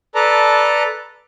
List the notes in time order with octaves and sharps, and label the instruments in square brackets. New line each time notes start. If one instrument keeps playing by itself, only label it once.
[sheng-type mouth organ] A4 B4 D5 A5 A#5